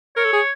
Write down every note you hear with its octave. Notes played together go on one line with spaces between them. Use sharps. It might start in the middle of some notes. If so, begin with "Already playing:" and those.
A#4 C#5
A4
G#4